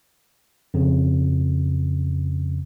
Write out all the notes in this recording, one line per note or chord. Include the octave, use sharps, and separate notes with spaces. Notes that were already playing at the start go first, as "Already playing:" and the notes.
F2 C#3